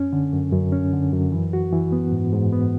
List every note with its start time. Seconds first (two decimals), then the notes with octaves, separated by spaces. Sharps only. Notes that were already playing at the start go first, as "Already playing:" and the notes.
Already playing: F#2 C#4
0.13 D3
0.32 F#2
0.53 F#2
0.72 C#4
0.93 D3
1.13 F#2
1.32 E3
1.53 F#4
1.73 E3
1.92 B3
2.12 G#2
2.32 G#2
2.53 B3